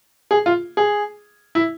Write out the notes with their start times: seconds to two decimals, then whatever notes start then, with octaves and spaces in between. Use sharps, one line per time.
0.31 G#4
0.46 F4
0.77 G#4
1.55 E4